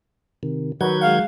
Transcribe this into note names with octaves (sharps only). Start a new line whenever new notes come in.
C3 D#3
D#3 F#3 B4 F#5 G6 G#6
G#3 F5 F#5